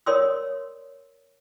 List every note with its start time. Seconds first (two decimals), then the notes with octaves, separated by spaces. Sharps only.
0.06 A#4 C#5 D5 C6 D#6 E6